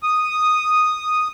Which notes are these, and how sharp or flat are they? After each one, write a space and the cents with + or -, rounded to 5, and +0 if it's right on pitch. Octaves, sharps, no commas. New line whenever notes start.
D#6 -5